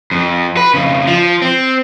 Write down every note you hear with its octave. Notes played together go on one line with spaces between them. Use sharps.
F2
B4
F2 C#3
F3
C4